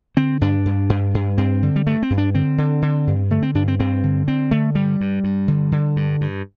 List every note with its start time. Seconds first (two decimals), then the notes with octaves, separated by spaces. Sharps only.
0.17 D3 C4
0.41 G2 D4
0.66 G2
0.90 G2
1.14 G2
1.38 G2 C4
1.63 D3
1.76 G3
1.87 G2 A3
2.03 C4
2.10 G2
2.18 D4
2.35 D3 C4
2.58 D3
2.82 D3
3.07 G2
3.30 D3 A3
3.42 C4
3.55 G2 D4
3.68 C4
3.79 G2 C4
4.03 D3
4.28 D3 C4
4.51 D3 A3
4.75 G2 G3
5.01 G2
5.24 G2
5.48 D3
5.72 D3
5.96 G2
6.21 G2